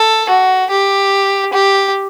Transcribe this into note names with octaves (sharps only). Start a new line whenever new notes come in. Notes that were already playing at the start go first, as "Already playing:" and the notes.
Already playing: A4
F#4
G4
G4